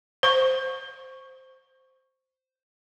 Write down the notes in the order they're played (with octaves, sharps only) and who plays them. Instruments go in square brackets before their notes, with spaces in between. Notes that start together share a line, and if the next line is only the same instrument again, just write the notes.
[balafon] C5 C#6